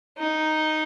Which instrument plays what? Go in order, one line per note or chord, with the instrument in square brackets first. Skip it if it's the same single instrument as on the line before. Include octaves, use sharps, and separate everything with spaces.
[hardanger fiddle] D#4